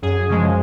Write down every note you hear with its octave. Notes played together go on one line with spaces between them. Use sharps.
F#2 G#4
C#3 F3 G#3